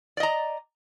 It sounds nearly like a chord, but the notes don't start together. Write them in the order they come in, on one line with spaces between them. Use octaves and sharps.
D5 D#5 A#5